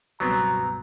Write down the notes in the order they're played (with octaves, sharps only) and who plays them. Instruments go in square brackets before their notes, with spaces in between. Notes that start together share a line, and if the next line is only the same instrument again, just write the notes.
[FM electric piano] C#2 G2 B2 [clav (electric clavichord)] F#3 B3 C4 [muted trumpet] A#5